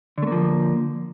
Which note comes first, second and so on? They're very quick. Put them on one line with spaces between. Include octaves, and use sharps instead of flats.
D3 A3 A#3 F3